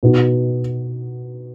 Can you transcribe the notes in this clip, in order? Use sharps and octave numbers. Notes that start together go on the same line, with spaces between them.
B2 B3 D#4 F#4